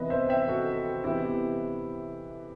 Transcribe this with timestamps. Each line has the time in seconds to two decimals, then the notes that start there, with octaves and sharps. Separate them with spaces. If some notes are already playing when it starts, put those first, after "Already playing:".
Already playing: C3 E3 B3 B4 D#5
0.10 C5 E5
0.29 E5 G5
0.48 F#4 A4
1.03 C3 E3 B3 E4 G4